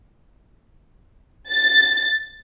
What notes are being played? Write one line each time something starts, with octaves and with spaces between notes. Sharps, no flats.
A6